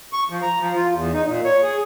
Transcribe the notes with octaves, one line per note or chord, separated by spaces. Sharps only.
C#6
F3
A#5
F3
F4
E2
D#4
A#2
C#5
G#4